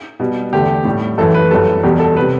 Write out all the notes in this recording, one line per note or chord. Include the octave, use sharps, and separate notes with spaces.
B2 G3
E2 D3 A3 G4
A2 G3
F#2 E3 A3 A4
B4
F#2 E3 G3 A4
E2 B2 G3 G4
A4
C3 G3 B4